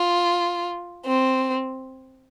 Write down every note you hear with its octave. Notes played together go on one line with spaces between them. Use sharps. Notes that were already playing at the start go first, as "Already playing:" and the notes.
Already playing: F4
C4